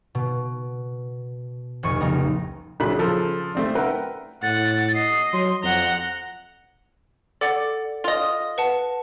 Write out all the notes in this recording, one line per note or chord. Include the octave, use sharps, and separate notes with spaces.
B2
F1 A#1 C#6 D#7
C#2 G3 A#3 C4 D#4 A#5
A#1 C#3 F#3 B5
C#3 F3 A4
A3 C4 D4
A#4 B4 E5 F#5 G5
A2 F#5 A6
D#5 C7
F#3 C6
F2 F#5 A#5 G7
A4 D5 F#5 A6
F4 D#5
B4 F#5 A5